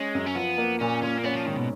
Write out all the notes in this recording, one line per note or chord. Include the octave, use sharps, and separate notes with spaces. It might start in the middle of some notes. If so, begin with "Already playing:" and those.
Already playing: G#3 C#4
F#2
C#4
F3 B3
A#3
A#2 C#4
A#2 C#4
A#3
B3 C#4
F3
G#2 D#3
B2